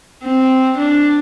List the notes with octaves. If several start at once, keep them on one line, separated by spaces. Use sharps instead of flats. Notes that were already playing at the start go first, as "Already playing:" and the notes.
C4
D4